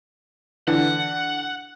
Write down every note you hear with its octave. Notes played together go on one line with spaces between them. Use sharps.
D3 E3 F#5